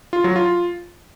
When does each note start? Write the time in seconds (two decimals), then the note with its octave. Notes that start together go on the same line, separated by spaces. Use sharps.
0.13 F4
0.24 F#3
0.36 F4